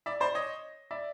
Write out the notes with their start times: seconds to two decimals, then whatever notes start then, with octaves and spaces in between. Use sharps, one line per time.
0.06 D5 E5
0.20 C5 D5
0.35 C#5 D#5
0.91 D5 E5